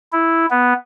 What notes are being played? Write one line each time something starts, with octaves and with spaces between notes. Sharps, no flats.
E4
B3